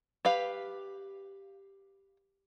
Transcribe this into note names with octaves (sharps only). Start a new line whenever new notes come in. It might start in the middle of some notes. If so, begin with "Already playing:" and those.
G4 B4 F5